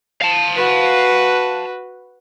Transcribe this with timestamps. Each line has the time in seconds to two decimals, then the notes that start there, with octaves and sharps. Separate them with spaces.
0.21 F5 A5
0.56 F#4 B4